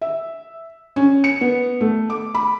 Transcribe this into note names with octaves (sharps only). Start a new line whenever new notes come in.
E5
C#4
C#7
B3
A3
D6
B5